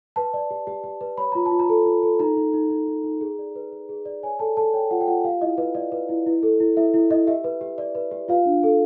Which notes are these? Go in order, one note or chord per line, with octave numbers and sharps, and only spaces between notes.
B4 A5
D5
G4
G4
G4
B4
C#5 B5
F4 A#5
A5
F4
A#5
A4
F4
A4
D#4 A#5
D#4
D#4
D#4
D#4
D#4
G#4
D5
B4
B4
G#4
D5
C#5 G#5
A4 A5
A4 A5
C#5 G5
F4 F#5
G5
F4 F#5
G4 F5
E4 D#5
B4 D#5
D5 D#5
B4
E4
E4
A4
E4
E4 E5
E4
E4 D#5
G4 E5
B4
G4
D5
B4
G4
F4 F5
D4
A4